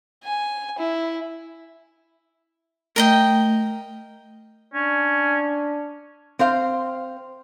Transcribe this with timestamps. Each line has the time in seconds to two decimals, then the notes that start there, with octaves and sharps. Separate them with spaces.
0.24 G#5
0.78 E4
2.96 A3 A#4 D#5 G5
4.74 C#4 D4
6.39 C4 C5 F5